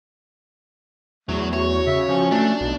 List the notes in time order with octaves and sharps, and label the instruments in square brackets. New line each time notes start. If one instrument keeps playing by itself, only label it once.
[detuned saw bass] E2 [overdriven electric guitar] F#3 [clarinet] A3
[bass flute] F#4 [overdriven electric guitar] C#5
[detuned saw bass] C#3 [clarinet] E5
[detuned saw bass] F3 [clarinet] C#4
[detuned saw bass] A3 [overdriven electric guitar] D4
[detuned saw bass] B1